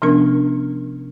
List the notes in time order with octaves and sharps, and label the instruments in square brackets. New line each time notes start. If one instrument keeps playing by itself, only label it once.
[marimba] C3 F3 B3 C#4 D4 A#4